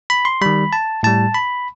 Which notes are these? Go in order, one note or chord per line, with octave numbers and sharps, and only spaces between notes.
B5
C6
D#3 G3 B5
A5
A2 G3 A5
B5